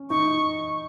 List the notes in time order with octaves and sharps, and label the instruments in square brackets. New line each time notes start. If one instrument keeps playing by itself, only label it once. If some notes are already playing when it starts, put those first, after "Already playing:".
Already playing: [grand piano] C#4
[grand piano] D#4 [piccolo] C#6